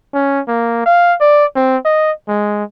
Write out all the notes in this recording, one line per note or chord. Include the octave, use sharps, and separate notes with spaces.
C#4
A#3
F5
D5
C4
D#5
G#3